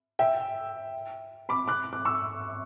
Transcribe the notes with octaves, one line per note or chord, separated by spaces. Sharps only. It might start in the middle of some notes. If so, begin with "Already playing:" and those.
E5 G5
B5 D6
D6 F#6
D6 F#6
C#6 E6